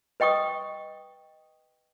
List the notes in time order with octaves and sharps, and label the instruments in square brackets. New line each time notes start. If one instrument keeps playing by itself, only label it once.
[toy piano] B4 D#5 G5 C#6 D#6